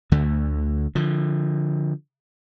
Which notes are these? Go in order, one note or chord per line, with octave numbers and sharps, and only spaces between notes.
D2 D3 A3
D3 F3